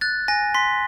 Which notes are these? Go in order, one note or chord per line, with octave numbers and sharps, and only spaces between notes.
F#6 A6
G#5 A#6
C6 B6